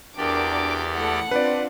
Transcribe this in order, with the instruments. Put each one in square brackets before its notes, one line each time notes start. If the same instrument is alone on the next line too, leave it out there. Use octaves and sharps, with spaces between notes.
[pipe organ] E2 G4 D5 [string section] D4 F#4 A#4 [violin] D6
[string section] A3 E4 A4 [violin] F#5
[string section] C4 D4 F4 [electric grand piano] B4 D5